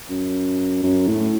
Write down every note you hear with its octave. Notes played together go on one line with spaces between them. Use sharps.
F#2
F#2
A2